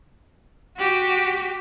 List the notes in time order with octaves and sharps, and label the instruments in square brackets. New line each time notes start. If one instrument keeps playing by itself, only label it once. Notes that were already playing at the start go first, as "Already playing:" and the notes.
[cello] F#4 G4